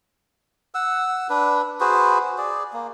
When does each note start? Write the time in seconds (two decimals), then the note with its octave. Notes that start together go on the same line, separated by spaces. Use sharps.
0.75 F#5 E6
1.30 D4 B4
1.80 F#4 G#4 B4 C5
2.38 G#4 D5
2.73 A#3